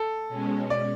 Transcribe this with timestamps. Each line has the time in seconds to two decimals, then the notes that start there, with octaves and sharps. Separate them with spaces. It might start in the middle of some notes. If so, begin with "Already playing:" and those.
Already playing: A4
0.28 B2 G#3 C#4
0.70 D5